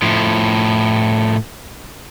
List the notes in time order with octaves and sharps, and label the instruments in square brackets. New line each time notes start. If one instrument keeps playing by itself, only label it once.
[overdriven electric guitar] A2 F3